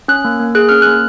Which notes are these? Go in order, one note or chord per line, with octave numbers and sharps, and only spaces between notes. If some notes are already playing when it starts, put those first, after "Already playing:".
C#4 F#6
A#3
A#3
G#4 F#6
C#4 F6
A#3 F#6